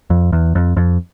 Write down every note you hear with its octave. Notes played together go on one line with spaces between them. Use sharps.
F2
E2
F2
F2